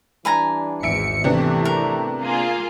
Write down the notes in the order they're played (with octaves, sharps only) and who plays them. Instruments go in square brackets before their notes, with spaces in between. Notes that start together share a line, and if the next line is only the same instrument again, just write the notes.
[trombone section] E3 G3 D4 [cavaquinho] B4 G#5 A#5
[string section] G#1 E2 C#7 [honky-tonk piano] E5 D7
[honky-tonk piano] C3 B3 D4 [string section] E3 [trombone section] A3 G4
[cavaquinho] A#4
[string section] A#3 F4 G#4